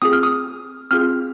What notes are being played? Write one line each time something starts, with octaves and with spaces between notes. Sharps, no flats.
C4 F4 G#4 D#6
F6
D#6
C4 F4 G#4 F6